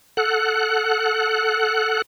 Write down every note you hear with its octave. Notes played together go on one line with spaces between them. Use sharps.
A4 F#5 F#6